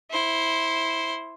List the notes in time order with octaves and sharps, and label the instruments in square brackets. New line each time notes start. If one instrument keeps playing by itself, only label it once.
[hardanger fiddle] E4 C5